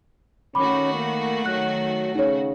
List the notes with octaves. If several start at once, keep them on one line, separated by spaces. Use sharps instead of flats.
D#3 A3 C#4 F#4 B5 D6
A#3
F#3 F#6
C#3 D#4 C#5